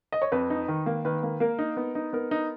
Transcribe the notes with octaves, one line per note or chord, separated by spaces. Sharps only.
D#5
C#5
F2 B4
D#4
D#3
A#3
D#3 B4
A#3
A#3 A#4
D#4
B3
D#4
B3 A#4
D#4